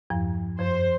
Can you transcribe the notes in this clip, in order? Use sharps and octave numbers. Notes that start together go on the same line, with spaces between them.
E2 G2 F3
F#2 F3 C5